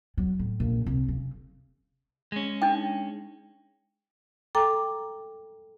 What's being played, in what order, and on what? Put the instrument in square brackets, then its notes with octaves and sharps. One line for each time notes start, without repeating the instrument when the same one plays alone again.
[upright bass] F#3
A2
A#1
C2
C#3
[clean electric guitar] G#3 C#4
[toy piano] D4 D#4 G5
[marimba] A4 G5 A#5 D6